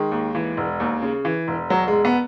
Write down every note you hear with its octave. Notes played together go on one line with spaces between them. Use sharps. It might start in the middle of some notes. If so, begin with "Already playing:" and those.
Already playing: D#3 G#3
D#2
E3
E1
D#2
C#3
E3
E1
E1 F#3
E1 G#3
B3